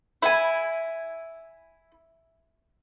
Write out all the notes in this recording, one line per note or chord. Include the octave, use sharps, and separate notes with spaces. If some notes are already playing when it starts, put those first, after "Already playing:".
E4 G#5